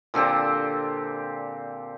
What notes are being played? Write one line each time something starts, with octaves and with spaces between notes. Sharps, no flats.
A#2 D3 C4 G4